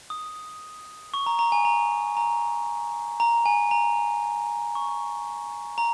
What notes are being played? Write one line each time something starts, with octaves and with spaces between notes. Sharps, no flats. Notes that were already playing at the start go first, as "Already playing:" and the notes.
D#6
C#6
A#5
A#5
G#5
A#5
A#5
A#5
G#5
A#5
C#6
A#5